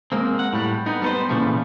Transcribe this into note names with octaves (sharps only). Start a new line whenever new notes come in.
G#3 A#3 C4
F#5
A2 G3
B3 D#4
G3 B3 A4 B4 C5
A#2 C#3 E3 F3 A3